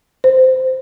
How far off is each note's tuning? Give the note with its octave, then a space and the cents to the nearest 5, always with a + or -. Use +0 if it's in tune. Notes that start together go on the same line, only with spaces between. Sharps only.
C5 -10